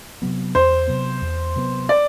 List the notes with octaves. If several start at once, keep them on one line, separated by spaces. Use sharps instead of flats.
C3 F#3 B3
E2 C5
C3 F#3 B3
E2
C3 F#3 B3
D5